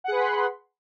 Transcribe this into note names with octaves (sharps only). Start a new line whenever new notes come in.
G#4 B4 F#5 B5 C6